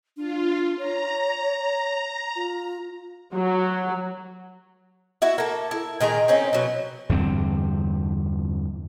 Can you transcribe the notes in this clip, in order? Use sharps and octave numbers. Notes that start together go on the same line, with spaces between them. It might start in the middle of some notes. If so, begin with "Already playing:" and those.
D4 F4
C#5 A#5
F4
F#3
E4 F#4 E5
A#3 A4
E4
A#2 D#3 G#4 A#5
C4 C#4 D#4
B2 F#3
E2 G2 D3 C4